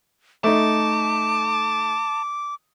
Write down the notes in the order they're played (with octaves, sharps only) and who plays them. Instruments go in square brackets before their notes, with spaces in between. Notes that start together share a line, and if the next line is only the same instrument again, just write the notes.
[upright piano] A3 D#4 [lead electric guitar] A5 [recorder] D6